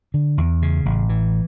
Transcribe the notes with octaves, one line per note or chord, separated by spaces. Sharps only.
D3
E2
C#3
A1
E3